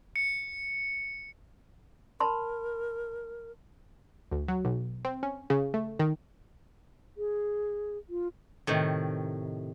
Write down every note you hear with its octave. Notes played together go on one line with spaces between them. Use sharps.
C#7
A#4 A5 B5 C6
D2
F#3
B1
C4
C#4
C#3
A3
D#3
G#4
F4
A2 C3 D#3